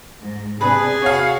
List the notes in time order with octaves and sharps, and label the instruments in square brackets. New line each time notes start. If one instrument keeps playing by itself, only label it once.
[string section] G#2
[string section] C3 D4 [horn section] G#4 [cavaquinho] B4 B5
[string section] F#4 [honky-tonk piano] C#5 F5